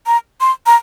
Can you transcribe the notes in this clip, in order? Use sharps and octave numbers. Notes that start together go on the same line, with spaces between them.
A#5
C6
A#5